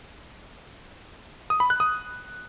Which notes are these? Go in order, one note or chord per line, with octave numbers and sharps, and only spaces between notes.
D#6
B5
F#6
D#6